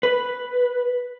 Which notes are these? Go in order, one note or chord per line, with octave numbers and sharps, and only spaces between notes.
B4